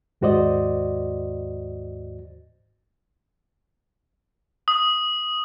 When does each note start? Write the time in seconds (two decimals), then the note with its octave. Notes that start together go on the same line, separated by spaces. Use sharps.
0.21 D#2 G#2 F#4 C5 D5 D#5
4.68 D#6